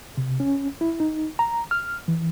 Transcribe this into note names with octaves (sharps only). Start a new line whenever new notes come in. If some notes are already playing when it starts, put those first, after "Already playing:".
C3
C#4
E4
D#4
A#5
F6
E3